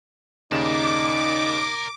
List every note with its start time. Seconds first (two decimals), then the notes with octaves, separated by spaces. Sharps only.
0.52 D#2 C#3 D#4 A#4 D5 D6 E7